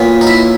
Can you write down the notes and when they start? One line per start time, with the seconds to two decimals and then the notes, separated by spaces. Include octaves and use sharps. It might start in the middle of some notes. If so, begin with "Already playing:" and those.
Already playing: A#2 F#3 B3
0.21 D#4
0.27 E4